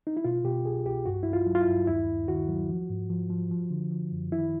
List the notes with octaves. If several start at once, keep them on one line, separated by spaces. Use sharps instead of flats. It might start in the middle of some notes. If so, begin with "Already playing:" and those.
D#4
E4
B2 F4
B2 G4
C2 G#4
C2 G4
G2 F#4
G2 E4
F4
F#3
F4
E4
G2
D#2 E4
D#2
D#3 F#4
F#3
F3
G#2
F3
F3
F3
D3
F3
F#2
D#3 E4